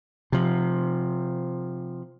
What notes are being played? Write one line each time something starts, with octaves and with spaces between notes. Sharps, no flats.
C3 F3